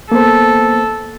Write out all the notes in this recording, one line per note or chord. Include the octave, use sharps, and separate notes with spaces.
A#3 B3 A4 C5